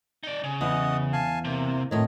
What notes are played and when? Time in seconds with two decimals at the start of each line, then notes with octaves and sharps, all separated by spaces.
0.23 D#4 D5
0.44 C#3
0.61 E2 D#5 F#5 D#6
1.13 F5 G#5 A5
1.45 C3 A#3
1.91 F2 A2 D#3 C#5 D#5